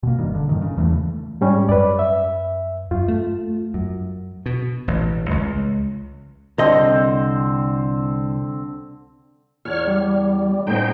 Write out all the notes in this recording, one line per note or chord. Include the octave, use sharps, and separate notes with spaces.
B2 A#3
F#1 G2 D#3
D3
G2 D#3
C#3
E2 E3 F3 A3
G#2 G3 C#4
F#2 B4 D5
E5
F#2 F4
A3
F#2
B2
A1
C#2
C2 D3 C4 D#5
E2 C#5 D5 F6
G3
A2 C#3 B3 D#4 C5 G5